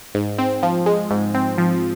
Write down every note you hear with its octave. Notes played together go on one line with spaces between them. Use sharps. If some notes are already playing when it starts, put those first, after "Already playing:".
G#2
C4
F3
G#3
G#2
C4
F3